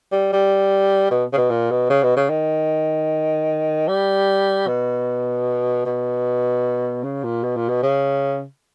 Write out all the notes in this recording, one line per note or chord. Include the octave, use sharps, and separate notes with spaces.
G3
G3
B2
C#3
B2
A#2
B2
C#3
B2
C#3
D#3
G3
B2
B2
C#3
A#2
B2
A#2
B2
C#3